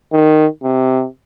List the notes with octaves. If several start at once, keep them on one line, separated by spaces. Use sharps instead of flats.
D#3
C3